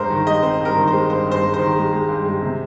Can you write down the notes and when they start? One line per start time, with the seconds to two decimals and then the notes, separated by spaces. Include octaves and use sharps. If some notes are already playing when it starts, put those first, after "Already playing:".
Already playing: G2 G#3 A#4 C5
0.10 D#3
0.27 G#3 D#5
0.42 C4 C5
0.60 G2
0.65 A#4
0.76 D#3
0.87 C5
0.93 G#3
1.10 G2 C5
1.26 G2
1.31 C5
1.42 G#3
1.53 C5
1.59 D#3
1.76 G#3
1.92 G#3
2.08 G2
2.25 G#3
2.42 C3